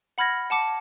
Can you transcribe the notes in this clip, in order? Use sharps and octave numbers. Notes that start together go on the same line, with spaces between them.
F#5 B5 F6 G#6 A#6
F#5 A5 D6 C#7